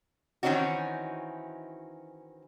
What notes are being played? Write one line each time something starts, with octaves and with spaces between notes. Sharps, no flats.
D#3 E3 C4 C#4 D#4 F#4